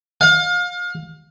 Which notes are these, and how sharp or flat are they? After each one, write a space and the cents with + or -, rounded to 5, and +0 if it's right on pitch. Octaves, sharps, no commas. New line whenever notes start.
F5 +30